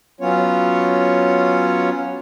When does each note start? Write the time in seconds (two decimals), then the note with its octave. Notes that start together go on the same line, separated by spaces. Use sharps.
0.21 F#3 B3 C#4 F4 C#5